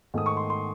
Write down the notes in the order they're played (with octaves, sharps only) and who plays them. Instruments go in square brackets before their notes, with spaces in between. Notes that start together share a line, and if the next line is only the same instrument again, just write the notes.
[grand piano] G#2 D#3 A3 D#4 [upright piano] D#6
[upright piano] C#6
C6
C6